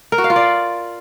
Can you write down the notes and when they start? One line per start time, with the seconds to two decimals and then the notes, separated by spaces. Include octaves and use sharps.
0.12 A#4
0.18 F#4
0.24 F5
0.30 F4
0.36 D5